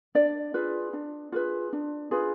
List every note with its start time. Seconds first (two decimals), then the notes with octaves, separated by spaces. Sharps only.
0.15 D4 D5
0.54 F4 G#4 B4
0.93 D4
1.32 F4 G#4 B4
1.73 D4
2.11 F4 G#4 B4